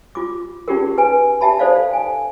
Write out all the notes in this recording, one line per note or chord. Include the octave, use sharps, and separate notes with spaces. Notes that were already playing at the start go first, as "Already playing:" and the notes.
F4 D6
C#4 D#4 F4 G4 G#4 A#4
B4 G#5
G4 E5 A5 B5
D#4 A4 C5 D5 F5
G5 G#5